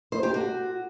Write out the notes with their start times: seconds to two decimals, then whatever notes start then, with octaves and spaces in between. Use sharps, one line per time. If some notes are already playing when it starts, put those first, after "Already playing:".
0.12 C5
0.23 G4
0.34 F#4